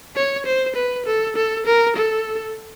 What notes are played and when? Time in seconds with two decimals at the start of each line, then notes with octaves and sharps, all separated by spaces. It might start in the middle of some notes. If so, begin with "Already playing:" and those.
0.16 C#5
0.46 C5
0.75 B4
1.06 A4
1.36 A4
1.66 A#4
1.96 A4